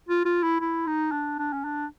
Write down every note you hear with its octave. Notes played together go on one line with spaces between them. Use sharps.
F4
F4
E4
E4
D#4
D4
D4
C#4
D4